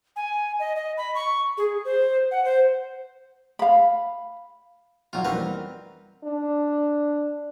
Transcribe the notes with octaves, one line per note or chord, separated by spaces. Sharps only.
G#5
D#5
D#5
B5
C#6
G#4
C5
F#5
C5
F5 B5
F2 B2 F#3 G3 F4
E3 G3 C4 A#4 B4
D4